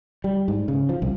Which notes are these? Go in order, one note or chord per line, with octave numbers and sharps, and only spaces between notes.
G3
G#2
C#3
F3
C2